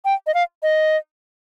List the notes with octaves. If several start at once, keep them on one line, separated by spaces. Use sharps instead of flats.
G5
D#5
F5
D#5